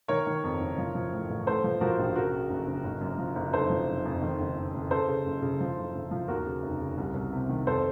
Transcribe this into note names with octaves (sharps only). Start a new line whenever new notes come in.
D#3 A#4 C#5
D#3
F2
F#1
F3
F3
A2
A1
A2 A4 C5
F3
F3 F#4 A#4
A#1
C#3 F#4 A#4
C#3
F#1
F#1
F#1
F#2
F3
F#1
F1 A4 C5
F3
F1
F2
D#3
F#1
F#1
F#1
C#3 A4 C5
C#3
F#1
C#3
F3
F#1
F#1
F3
D#2 F#4 A#4
C#3
F1
C#3
C2
C2
C3
D#3
F2 A4 C5